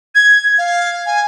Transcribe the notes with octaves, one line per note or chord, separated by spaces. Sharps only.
G#6
F5
G#5